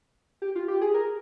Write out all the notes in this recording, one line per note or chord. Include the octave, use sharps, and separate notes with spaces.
G4
F4
G4
G#4
A#4